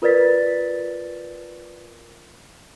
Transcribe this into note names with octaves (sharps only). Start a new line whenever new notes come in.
F4 A#4 B4 D5 A6 B6